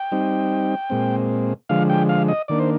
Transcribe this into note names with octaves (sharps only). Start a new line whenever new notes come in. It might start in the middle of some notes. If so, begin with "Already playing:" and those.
Already playing: G5
G3 C4 D#4
A#2 G#3 C4
D3 F3 G#3 F5
G5
F5
D#5
D#3 A#3 D4 D5
C5